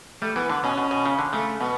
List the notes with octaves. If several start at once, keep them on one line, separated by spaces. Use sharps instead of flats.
G3 A3
E3 B3
D3 B3
B2 C#4
B2
B2
C#3
D3
C#3 A3
B2 B3